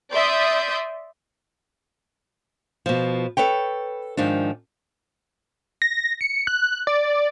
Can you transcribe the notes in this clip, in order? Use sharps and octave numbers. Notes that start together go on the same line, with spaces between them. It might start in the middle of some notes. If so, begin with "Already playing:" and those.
D5 E5 C6 D#6 G6
B2 F3
A4 B4 C#5 G5
G#2 D#3 F3 D4
A#6
C#7
F#6
D5